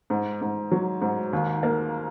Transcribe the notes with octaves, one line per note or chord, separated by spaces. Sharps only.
G#2
G#2
F#3
G#2
D#2
A#3